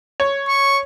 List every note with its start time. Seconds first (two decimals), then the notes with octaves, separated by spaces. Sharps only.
0.20 C#5
0.48 C#6